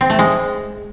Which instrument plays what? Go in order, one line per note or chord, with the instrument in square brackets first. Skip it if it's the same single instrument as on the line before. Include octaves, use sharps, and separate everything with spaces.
[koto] C4
A3
G#3